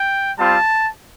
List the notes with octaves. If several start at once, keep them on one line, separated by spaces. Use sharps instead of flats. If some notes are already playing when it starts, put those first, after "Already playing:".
Already playing: G5
G3 C4 F4 A5